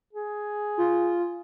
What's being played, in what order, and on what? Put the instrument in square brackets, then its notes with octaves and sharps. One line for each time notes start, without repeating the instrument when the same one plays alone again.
[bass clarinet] G#4
[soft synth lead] F4